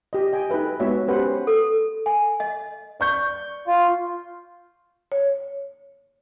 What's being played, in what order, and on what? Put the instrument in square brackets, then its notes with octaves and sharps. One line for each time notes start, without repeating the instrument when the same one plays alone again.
[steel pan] G4 D#5
D#5 G5 G#5
D#4 F#4 A4 B4 E5
G#3 B3 F#4 C#5 E5
C#4 G4 B4 C5 F#5
[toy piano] A4
G#5
D#5
[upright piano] D5 C#6 G6
[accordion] F4
[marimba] C#5